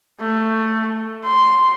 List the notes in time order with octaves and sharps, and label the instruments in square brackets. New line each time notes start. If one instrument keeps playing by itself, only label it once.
[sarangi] A3
C6